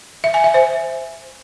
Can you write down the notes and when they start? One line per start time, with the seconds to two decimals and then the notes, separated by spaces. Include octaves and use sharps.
0.24 E5
0.34 G#5
0.44 E5
0.54 C5